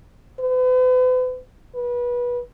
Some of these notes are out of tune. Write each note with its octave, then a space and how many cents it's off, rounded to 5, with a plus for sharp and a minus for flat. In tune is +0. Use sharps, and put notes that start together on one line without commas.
B4 +40
B4 -25